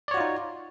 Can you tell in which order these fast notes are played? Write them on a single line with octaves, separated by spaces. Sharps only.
D5 C#5 F#4 F4 D#4